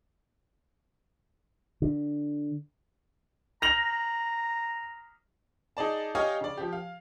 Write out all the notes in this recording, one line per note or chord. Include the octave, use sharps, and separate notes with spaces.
D3
A#5 A#6 F7 F#7
D#4 G#4 D5 A5
G4 C#5 D#5 F5 G5 G#5
C#3 D5
F3 G4
F5